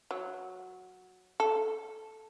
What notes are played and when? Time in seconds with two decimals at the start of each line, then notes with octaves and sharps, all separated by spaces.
0.11 F#3
1.40 A4